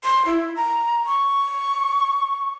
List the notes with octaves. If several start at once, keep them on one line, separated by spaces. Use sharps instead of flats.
C6
E4
A#5
C#6